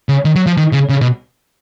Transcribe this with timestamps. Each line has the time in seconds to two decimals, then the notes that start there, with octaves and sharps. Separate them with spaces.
0.09 C#3
0.25 D#3
0.36 F#3
0.46 F3
0.57 D#3
0.73 C#3
0.89 C#3
1.01 B2